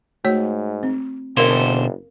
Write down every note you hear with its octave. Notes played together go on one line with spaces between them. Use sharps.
G#2 A3 F#4 C#5
C4
F#1 B2 D3 A#4 C5 F5